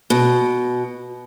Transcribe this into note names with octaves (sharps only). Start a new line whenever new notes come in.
B2